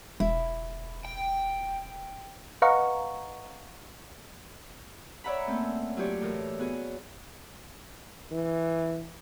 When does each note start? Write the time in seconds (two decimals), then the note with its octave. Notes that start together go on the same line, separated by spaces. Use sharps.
0.20 E1 E4
1.05 G5
2.62 B4 D#5 F5 F#5 A#5 C#6
5.24 C#5 D5 E5 F#5 A#5 B5
5.47 A3 A#3 C4 C#4
5.97 F#3 F4 G4 C#5 D5
6.21 A2 E3 A#4
6.59 B3 F#4 G#4
8.32 E3